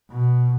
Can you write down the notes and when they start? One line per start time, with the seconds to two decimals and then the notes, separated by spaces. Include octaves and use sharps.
0.11 B2